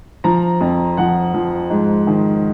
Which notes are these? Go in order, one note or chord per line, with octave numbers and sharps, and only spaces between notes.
F3 A#5
F2
F3 F#5
F3
G#2
D#3